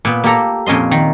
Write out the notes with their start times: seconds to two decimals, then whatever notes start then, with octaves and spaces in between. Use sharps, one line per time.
0.05 A#2 B3
0.24 A#3 G4 A4 A#5
0.66 F2 A#2 C#4 D#5 C6
0.91 D#3